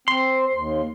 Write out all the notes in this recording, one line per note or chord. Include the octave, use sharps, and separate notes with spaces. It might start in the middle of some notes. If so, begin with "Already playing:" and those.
C4 C6
D#2